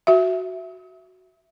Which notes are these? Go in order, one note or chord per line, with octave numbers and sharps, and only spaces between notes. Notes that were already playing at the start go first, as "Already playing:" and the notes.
F#4 E5